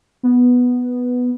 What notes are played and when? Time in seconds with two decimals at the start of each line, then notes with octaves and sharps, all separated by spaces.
0.23 B3